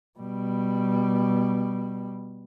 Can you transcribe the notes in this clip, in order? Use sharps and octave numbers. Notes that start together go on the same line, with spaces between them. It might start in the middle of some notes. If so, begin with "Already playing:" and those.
B2 G3